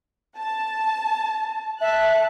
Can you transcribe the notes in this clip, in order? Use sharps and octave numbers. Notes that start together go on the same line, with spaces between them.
A5
E5 A5 F#6